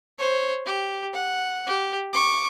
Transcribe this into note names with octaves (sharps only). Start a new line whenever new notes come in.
C5 C#5
G4
F#5
G4
C#6 D6